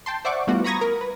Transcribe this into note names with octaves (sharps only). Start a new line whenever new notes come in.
G5 A5 C6
C5 D5 E5 F#5 C#6 D6
E3 G3 A3 B3 F4 F#4
A#5 B5 C#6 D#6 G#6 A#6
A#4
B4